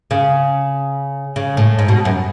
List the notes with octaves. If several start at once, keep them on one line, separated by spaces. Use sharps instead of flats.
C#3
C#3
A2
G#2
B2
F#2